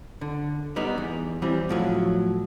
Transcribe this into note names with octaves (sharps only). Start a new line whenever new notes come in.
D3
G3 B3 D#4
E2
E3 G3 C4
A2 F3 F#3